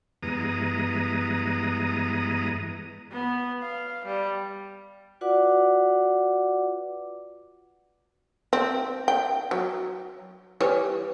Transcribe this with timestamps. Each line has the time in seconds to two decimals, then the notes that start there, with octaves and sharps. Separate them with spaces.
0.23 G2 E3 G#3 B3 A#5 D#6
3.12 B3
3.62 F5
4.05 G3
5.21 F4 F#4 B4 D5 F#5 D6
8.53 C4
9.08 G5
9.51 F#3
10.61 E3 G3 C#5